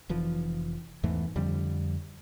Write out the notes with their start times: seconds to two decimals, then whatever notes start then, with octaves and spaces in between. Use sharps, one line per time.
0.09 F1 E3 F3
1.03 E2 G#2 E3 A3
1.36 F2 D3 F3 G3